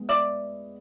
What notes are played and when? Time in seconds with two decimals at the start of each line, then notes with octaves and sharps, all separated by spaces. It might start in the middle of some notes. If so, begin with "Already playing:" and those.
Already playing: G#3 B3
0.09 D5 E5